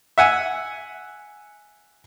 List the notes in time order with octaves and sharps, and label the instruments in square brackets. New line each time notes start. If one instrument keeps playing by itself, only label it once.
[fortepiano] E5 F#5 G#5